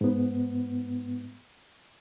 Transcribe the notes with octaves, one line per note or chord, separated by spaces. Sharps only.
G#2 B3